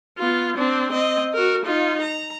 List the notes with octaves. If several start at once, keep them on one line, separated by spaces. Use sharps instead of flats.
B3 F4
C4 D4
C4 D#5
F#4 A#4
D#4 F4
A#5